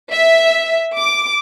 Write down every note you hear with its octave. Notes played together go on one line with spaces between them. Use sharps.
E5
D6